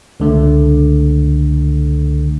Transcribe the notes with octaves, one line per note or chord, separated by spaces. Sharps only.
C#2 D3 A3